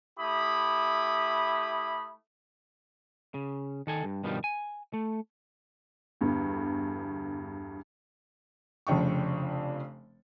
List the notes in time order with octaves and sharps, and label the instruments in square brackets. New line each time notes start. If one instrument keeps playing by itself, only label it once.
[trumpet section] A3 E4 G4 B5 D#6
[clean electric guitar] C#3
D#3 A4 G#5
G2
G2 B2 D#3 F3 G3
G#5
A3
[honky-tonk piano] E2 G2 D3
[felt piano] F1 F2 C#3 D4 G5 C#6